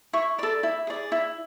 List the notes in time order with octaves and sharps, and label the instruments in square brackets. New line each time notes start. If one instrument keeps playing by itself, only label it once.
[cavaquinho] E4 C#6
A4 D5 B5
E4
G#4 D5
E4